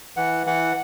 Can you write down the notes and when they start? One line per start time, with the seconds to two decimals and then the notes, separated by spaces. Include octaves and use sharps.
0.17 E3 F#5
0.46 E3 F#5